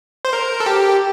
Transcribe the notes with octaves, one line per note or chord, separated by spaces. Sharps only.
C5
A#4
A4
G4